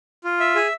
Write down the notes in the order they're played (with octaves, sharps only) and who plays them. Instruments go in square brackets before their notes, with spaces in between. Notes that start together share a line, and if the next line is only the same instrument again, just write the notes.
[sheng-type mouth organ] F4
E5
G#4